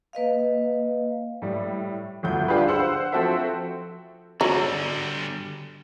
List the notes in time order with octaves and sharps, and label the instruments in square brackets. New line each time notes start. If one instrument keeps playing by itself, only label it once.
[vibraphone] A#3 B4 D#5 F5
[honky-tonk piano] A2 G3
G1 D2 G6
D4 F4 G4 G#4 B4
C5 F#5 E6
F3 C4 F#4 A4 C5 E5
[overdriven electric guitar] D3 G3 [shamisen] F#3